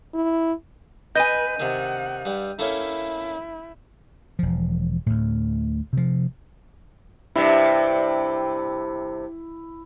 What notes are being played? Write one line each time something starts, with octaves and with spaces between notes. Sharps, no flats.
E4
B4 D#5 G#5 G6 D#7
C3 D#3 F#5
G2 G3
A3 A#3 C#4 E4
E1 F3
D2 A2
C3 F3
G2 C3 E4